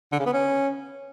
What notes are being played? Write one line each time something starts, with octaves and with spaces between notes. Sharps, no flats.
D3
C#3
B3
C#4